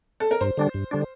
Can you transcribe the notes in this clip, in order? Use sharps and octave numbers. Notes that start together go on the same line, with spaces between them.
A4
A#4
G2 C5
D3 G3 D4
G2
D3 G3 D4